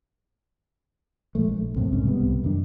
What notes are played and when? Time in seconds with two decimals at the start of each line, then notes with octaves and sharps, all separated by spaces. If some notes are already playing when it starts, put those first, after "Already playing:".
1.35 A#1 G#3 A3
1.49 A#1
1.76 F#2 A2 C3
1.93 C2 G#2 C#4
2.07 C2 C3 G3 B3
2.44 F#2 D#3 D4